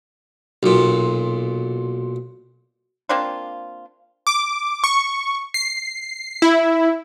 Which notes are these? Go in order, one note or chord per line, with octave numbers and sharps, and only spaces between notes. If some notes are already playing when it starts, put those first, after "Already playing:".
B1 A#2
A#3 C4 D4 F4
D6
C#6
C7
E4